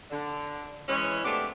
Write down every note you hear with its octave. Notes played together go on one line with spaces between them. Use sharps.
D3
E3 G#3 C#4
G#3 A3 B3 C4 D4 G4